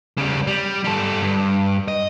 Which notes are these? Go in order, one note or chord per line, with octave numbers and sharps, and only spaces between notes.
C#3 G3
G3
G3 A4
G2
D#5